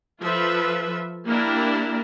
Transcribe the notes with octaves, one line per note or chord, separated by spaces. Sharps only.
F3 F4 A4 B4 E5
A#3 D4 E4 G4 A#4